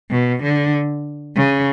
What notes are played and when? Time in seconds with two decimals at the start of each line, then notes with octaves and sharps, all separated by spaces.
0.11 B2
0.43 D3
1.36 C#3